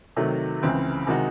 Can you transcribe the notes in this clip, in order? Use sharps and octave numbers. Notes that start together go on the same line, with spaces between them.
C3 D#3 F#3 A3
C#2 C#3 E3 C4 E4
C3 D#3 G#3 D#4 F#4